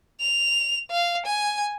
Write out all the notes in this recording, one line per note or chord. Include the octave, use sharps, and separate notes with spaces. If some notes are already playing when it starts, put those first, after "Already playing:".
F7
F5
G#5